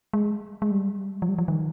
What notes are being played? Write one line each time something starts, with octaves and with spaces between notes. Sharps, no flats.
G#3
G#3
G3
F3
G3
F3
D#3